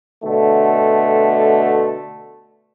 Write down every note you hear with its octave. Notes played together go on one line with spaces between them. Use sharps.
B2 D3 A3